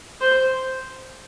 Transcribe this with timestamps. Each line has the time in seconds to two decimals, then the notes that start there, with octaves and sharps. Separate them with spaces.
0.21 C5